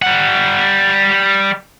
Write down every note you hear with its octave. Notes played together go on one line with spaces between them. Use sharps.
G3 F#5